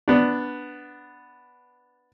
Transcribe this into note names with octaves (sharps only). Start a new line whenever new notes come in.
B3 D4